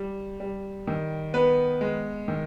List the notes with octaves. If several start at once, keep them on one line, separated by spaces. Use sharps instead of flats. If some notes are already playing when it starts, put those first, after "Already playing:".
Already playing: G3
G3
D#3
B3 B4
G#3
D#3